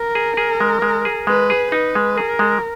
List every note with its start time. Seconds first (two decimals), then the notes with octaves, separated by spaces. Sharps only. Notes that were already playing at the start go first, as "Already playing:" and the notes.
Already playing: A#4
0.15 G#4
0.37 G#4
0.60 G#3
0.82 G#3
1.05 G#4
1.27 G#3 B4
1.50 G#4
1.72 D#4 B4
1.95 G#3
2.17 G#4 A#4
2.39 G#3